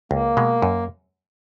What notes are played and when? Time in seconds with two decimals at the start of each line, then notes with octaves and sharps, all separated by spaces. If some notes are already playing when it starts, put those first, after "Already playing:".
0.11 C#2 A#3
0.37 B2 G#3
0.62 F#2